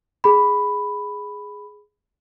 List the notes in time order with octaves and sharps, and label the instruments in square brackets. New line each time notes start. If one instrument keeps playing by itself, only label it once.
[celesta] G#4 B5